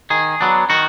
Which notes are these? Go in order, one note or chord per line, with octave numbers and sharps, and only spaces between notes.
D#3 G#4
F#3 B3 D4
D#3 F#4